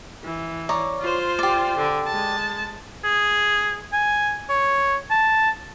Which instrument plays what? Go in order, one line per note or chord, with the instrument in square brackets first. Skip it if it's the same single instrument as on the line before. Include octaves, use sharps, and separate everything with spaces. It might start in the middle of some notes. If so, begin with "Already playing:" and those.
[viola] E3
[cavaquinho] C#5 D5 A#5
[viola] F4 C5
[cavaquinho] G4 D5
[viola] D3
G#3 A5
[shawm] G#4
G#5
C#5
A5